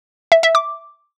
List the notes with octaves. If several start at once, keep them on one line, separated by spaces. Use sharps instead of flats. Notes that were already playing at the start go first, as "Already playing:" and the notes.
E5
E5
D6